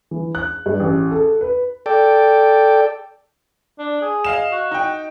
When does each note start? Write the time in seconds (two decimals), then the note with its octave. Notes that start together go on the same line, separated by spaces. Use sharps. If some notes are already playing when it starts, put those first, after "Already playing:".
0.11 E3
0.35 F#6
0.66 G2
0.80 A1
1.11 A4
1.41 B4
1.86 A4 D5 G5
3.79 D4
4.02 G#4
4.25 D#5 F5 E7
4.52 F#4
4.71 D#4 G5